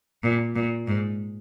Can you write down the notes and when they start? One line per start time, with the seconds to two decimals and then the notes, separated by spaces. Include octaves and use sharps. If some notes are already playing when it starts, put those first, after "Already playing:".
0.24 A#2
0.56 A#2
0.88 G#2